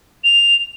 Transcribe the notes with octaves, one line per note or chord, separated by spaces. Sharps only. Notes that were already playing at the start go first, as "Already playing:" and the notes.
F7